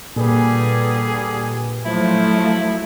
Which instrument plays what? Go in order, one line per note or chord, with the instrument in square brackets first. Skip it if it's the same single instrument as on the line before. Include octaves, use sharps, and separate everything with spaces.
[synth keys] A#2 B4 [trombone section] D3 G3 G#4
[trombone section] F3 [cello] F#3 A3 [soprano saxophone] E4